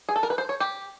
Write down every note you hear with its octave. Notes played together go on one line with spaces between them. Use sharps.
G#4
A4
A#4
B4
C5
C#5
G4